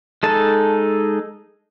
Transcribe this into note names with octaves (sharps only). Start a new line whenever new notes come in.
G#3 D#4 A4 A5